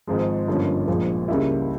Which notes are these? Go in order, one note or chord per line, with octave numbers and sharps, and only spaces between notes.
G#1 G#2 F3 G#3
G1 G2 F3 A#3 C#4
A#1 A#2 F3 G#3
C#2 C#3 G3 A#3 E4